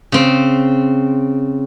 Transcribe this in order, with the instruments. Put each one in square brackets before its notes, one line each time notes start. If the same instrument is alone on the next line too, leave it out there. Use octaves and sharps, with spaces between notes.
[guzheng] C#3 C4